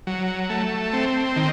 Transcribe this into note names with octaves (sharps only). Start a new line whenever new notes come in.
F#3
A3
C4
D#3